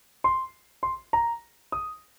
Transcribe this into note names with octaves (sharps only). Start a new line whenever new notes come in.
C6
C6
A#5
D#6